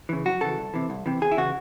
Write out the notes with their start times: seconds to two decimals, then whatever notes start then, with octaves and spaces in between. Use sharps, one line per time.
0.09 C#3 E3
0.25 F#2 F#4
0.41 C#3 E3 A4
0.57 C2
0.74 C3 E3
0.90 C2
1.06 C3 E3
1.21 E2 G#4
1.32 E4
1.37 C#3 E3 F#4